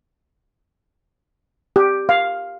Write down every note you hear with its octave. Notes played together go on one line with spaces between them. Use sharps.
G4
F5